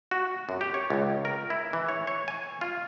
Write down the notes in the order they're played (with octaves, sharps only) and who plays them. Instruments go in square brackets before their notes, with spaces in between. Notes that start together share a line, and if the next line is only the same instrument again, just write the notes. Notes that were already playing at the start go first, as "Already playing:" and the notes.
[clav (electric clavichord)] F#4
F#2
G4
C#5
C#2
A#4
E4
E3
C#5
C#5
G#5
F4